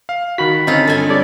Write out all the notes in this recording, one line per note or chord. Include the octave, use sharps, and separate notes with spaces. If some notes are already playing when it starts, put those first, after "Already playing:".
F5
D#3 F#4 B5 B6
D3 C4 C#4 D#4 F4
G2 A4 G#5
G3 C#5 D5